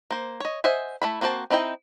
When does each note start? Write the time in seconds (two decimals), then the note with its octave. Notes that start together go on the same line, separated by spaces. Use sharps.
0.11 A#3 C5
0.40 C#5 D#5
0.64 C5 D#5 E5 F#5 G#5
1.02 A3 E4 B5
1.21 A#3 C4 F#4 C5 A5
1.50 C4 D#4 E4 D#5 G5